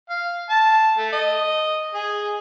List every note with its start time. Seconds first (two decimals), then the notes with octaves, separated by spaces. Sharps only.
0.10 F5
0.50 A5
0.98 A3
1.13 D#5
1.94 G#4